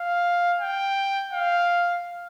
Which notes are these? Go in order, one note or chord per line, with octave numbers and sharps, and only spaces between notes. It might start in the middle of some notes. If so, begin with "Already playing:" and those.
Already playing: F5
G5
F5